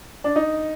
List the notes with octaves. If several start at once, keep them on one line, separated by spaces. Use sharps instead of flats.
D4
D#4